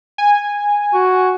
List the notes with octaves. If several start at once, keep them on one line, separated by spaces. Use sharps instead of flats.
G#5
F#4